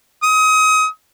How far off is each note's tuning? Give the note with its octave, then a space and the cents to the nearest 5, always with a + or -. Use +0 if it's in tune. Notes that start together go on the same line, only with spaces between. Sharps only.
D#6 +30